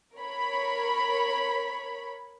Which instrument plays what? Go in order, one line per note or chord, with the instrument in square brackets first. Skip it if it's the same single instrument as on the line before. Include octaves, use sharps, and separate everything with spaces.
[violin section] A#4 C#5 B5